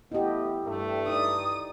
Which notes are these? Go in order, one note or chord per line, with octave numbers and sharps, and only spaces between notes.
A3 B3 E4 G4 D#5
G2 A3
D#4 D5 D#6